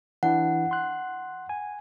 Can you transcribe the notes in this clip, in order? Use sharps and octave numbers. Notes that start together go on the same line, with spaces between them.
E3 D4 E4 F#5
C6 F#6
G#5